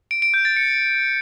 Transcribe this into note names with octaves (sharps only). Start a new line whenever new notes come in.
D7
D7
G6
A6
C#7